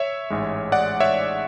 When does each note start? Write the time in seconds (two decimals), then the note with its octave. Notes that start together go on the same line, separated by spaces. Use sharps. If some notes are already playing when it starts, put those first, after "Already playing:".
Already playing: C#5 E5
0.30 A1 G#2 G#3
0.72 D5 F#5
1.00 C#5 E5